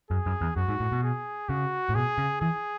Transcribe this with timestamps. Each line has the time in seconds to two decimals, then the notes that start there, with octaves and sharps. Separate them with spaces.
0.10 F#2 G#4
0.26 F#2
0.41 E2
0.56 F#2 F#4
0.68 G#2
0.80 A2
0.92 B2
1.03 G#4
1.49 C#3 F#4
1.89 A2
1.95 B2 G#4
2.18 C#3
2.41 E3 G#4